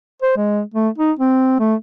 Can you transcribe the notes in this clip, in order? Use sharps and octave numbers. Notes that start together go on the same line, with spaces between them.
C5
G#3
A3
D#4
C4
A3